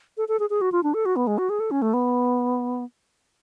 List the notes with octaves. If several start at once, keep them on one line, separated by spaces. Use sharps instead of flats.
A4
A4
G#4
G#4
F#4
F4
D4
A4
F#4
B3
G#3
F#4
G#4
A4
C#4
A3
B3